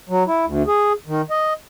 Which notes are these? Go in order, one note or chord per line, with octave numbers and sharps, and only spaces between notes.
F#3
E4
D2
G#4
D#3
D#5